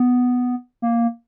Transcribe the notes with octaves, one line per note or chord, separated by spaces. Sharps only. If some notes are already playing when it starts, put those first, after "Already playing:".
Already playing: B3
A#3